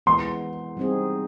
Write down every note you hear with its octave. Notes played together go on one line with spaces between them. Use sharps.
E3 G#3 B3 C6
G3 C4 D#4 G#4